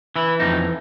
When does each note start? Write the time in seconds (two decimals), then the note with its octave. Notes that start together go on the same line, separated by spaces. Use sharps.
0.16 E3 E4
0.40 F2 D#4